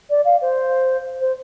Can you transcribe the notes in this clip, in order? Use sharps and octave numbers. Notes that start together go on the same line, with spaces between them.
D5
F5
C5
C5